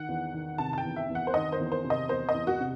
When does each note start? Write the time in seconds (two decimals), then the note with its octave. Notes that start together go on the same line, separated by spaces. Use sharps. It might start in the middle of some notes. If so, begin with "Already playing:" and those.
Already playing: D#3 F#5
0.08 E2
0.33 D#3
0.58 C3 A5
0.73 A5
0.78 G5
0.84 E2
0.96 E5
1.09 E2
1.15 F#5
1.27 C5
1.34 D#3 D#5
1.52 C5
1.60 E2
1.72 C5
1.84 C3
1.90 D#5
2.09 E2 C5
2.29 D#5
2.34 E2
2.47 F#4
2.60 C3